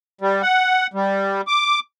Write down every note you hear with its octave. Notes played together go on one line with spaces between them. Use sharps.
G3
F#5
G3
D6